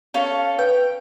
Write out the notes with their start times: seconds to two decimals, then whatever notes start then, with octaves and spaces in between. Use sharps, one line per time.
0.14 C#4 A4 F5
0.59 B4 G5